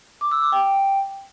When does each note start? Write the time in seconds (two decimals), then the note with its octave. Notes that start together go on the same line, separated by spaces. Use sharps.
0.21 D6
0.31 E6
0.42 D6
0.52 G5